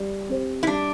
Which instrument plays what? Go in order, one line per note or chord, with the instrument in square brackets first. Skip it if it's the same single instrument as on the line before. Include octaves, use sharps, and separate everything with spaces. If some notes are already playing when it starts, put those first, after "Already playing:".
Already playing: [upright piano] G3
C4 G4 C5
[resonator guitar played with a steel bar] E4
[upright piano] G3 [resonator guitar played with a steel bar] D4